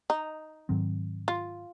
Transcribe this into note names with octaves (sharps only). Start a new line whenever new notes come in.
D#4
G#2 D#3 F#3 C4
F4